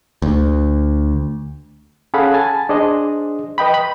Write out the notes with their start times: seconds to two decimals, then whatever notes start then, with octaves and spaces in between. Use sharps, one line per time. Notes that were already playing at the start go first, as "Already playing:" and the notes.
0.22 D2
2.14 C#4 G#4 A4 F5 F#5 B5
2.34 G#5 A5 A6
2.69 D4 G#4 C5 D#5
3.58 B4 D#5 G5 B5
3.74 B5